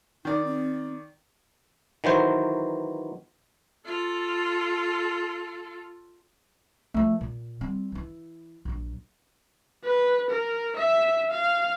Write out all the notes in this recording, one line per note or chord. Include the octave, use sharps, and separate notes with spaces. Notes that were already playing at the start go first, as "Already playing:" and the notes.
D#3 D#4 D5
C4
D#3 E3 F#3 C5
F4 A4
F3 A3
A#2
G3 C4
E3 E4
A#1 F#3
B4
A#4
E5
F5